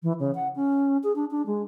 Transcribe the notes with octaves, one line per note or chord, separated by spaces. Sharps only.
E3
C#3
F#5
C#4
G#4
D4
D4
G#3